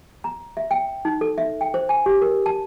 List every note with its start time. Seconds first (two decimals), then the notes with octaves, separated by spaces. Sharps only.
0.24 A#5
0.57 E5
0.71 G5
1.05 D#4
1.21 A4
1.38 E5
1.61 G5
1.74 C5
1.89 G#5
2.06 G4
2.22 A#4
2.46 A5